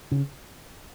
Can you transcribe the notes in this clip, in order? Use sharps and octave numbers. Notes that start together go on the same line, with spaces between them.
C#3